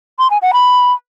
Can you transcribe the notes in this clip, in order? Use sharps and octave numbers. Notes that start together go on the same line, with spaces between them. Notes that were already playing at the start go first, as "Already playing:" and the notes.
C6
G#5
F#5
B5